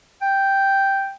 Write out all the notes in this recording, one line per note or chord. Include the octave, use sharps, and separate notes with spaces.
G5